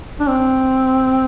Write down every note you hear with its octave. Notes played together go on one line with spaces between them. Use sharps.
D4
C4